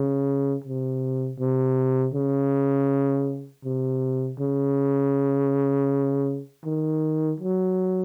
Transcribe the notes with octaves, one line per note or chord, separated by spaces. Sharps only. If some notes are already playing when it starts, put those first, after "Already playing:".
Already playing: C#3
C3
C3
C#3
C3
C#3
D#3
F#3